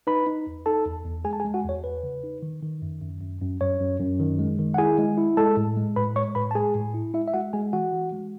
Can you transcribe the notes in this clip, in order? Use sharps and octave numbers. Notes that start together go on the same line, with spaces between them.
D#4 B4 B5
D#4
E2
D#4 A4 A5
E2
E2
G#3 G#4 G#5
A5
G#4 G#5
G#3
F#4 F#5
E2 C#5
E2 B4
C#3
D#4
D#3
D#3
F#2
F#2
F#2
F#2
F#2 C#5
F#2
F#2
D#3
G#3
D#3
F#5
E4 G#4 G#5
G#3
E4
G#3 A4 A5
A2
G#3
A2 B4 B5
G#3 C#5 C#6
A2 B4 B5
A5
G#3 G#4 G#5
A2
E4
G#3 E4 E5
E5
G#3 F#4 F#5
G#3 G#4 G#5
E3 F#4 F#5
E3
G#3